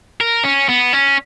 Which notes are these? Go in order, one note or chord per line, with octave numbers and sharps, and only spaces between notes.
A#4
C#4
B3
C#4